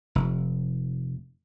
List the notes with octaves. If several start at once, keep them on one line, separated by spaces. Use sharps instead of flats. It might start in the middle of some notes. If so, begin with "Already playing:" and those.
F1